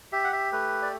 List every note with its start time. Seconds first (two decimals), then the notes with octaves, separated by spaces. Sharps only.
0.12 G4 E5
0.24 F#5
0.32 E5
0.52 A3 B4
0.82 D5